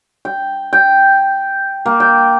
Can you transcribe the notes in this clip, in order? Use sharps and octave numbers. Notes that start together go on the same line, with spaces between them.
G5
G5
A#3
G5